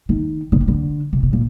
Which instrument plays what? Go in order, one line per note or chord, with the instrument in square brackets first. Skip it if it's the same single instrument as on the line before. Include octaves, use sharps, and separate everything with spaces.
[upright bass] D#3
D3
C3
D3
C3
C3
A#2